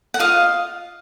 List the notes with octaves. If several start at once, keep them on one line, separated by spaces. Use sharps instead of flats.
F#5
F4 D#5 F5